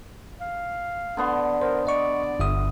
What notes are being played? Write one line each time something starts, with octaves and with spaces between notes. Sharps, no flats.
F5
D3 B3 C6
A#4 C5
D5 D#5 C#6
G1 E5 D#6